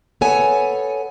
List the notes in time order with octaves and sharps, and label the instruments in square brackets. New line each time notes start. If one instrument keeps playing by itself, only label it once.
[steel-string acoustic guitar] B3 A4 C#5 G#5